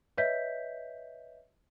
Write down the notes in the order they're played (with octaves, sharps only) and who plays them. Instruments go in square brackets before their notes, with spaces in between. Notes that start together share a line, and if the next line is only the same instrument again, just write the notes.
[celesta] B4 C#5 D#5 E5 G6 B6